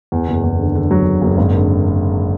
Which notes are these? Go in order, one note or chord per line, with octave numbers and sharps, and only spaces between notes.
E2
F#1
E2
D3
D3
F#3
D3
F#1
G#1
D3